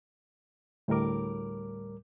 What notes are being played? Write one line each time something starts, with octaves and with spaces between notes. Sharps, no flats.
D2 A2 G3 A#4 D6